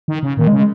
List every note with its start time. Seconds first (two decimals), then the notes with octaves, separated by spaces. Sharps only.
0.08 D#3
0.23 C#3
0.37 A#2 D#3
0.47 G#3
0.52 C#3
0.58 G#3